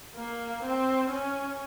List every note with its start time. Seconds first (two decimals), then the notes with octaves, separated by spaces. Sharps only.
0.15 A#3
0.63 C4
1.10 C#4